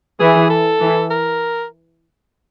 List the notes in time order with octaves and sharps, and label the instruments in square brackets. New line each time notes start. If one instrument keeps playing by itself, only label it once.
[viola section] E3 [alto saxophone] G#4
[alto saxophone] A4
[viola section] E3
[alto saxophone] A#4